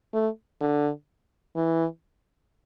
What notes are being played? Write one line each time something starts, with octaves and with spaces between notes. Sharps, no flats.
A3
D3
E3